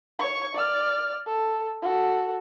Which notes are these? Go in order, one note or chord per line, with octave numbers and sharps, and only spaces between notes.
C#5 C#6
D5 F6
A4
F#4 A4